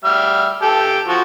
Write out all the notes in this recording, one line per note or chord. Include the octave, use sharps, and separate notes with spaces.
G3 E5 F6
G4 A4
F3 F#4